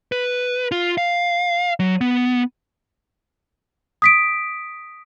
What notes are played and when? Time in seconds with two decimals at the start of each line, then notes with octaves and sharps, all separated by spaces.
0.12 B4
0.72 F4
0.98 F5
1.80 F#3
2.01 B3
4.02 D#6 B6 D7